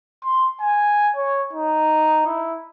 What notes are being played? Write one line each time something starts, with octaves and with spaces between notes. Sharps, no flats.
C6
G#5
C#5
D#4
E4